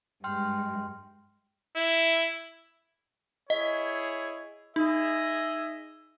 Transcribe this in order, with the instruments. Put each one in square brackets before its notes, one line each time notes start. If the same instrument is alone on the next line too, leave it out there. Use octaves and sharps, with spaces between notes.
[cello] G2 G#3 [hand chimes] G5 C6 F6
[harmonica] E4
[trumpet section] E4 G#4 C#5 [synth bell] D#5
[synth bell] D#4 [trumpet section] G#4 D#5 E5